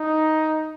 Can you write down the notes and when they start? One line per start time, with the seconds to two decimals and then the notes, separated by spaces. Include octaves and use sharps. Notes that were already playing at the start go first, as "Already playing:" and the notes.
Already playing: D#4